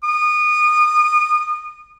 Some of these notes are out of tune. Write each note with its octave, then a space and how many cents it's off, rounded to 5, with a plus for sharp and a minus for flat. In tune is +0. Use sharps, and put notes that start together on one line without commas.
D#6 -30